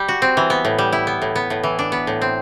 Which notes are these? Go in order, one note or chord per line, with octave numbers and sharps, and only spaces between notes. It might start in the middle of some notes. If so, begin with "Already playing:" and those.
Already playing: G3
F#4
C4
E3
B3
A2
G3
E4
B3
A2
B3
A2
E3
D4
B3
A2
C4